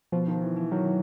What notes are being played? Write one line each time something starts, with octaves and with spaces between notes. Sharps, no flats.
B2 F3
D#3
E3
E3
D#3 F#3
E3